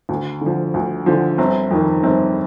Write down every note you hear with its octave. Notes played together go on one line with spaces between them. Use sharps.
D2
D3 F3
D2
D3 F3
G1 C4
F2 D#3
G1 C4